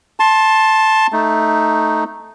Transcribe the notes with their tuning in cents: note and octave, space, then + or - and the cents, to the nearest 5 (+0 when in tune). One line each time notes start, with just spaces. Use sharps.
A5 +0 C6 +20
A3 +0 D#4 +0